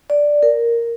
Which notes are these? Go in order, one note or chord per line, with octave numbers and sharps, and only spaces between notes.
D5
A#4